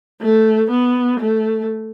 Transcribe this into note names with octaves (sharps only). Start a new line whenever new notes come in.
A3
B3
A3